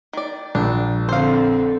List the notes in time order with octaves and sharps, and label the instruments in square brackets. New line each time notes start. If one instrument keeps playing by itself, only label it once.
[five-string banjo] D#3 D5
[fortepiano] A#1 [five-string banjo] D4
[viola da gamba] D3 C4 A4 [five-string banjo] C5 F5